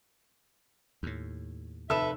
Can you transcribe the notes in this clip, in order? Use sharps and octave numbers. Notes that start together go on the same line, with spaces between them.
D#2 A2
F1 A4 B4 E5 E6 E7